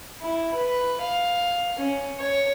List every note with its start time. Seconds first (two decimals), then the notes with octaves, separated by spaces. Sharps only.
0.21 E4
0.54 B4
1.02 F5
1.78 C#4
2.18 C#5